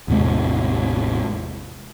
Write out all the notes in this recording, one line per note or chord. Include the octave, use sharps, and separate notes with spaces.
A1 E2 C3 G#3